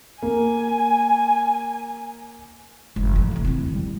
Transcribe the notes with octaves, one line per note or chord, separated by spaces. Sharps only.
A#3 G#5
F#1 F2 G#2
A1 F3 A3
C2 A3
C4 E4
D#1 E2
G3